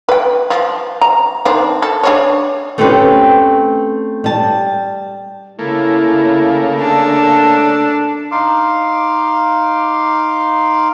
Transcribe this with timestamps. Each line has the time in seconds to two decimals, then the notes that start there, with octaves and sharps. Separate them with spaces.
0.09 B4 G5
0.50 F3
1.01 A#5
1.45 D#3 C4 D4
1.82 A4
2.03 D4 G#4 C#5
2.78 A3 C4 C#4 F4 G4 B4
4.24 G3 A5
5.59 C#3 A3 A#3 E4
6.79 D4 A4
8.31 D#4 F5 C6 D6